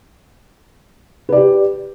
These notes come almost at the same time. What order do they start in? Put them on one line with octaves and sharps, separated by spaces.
B4 D5 G4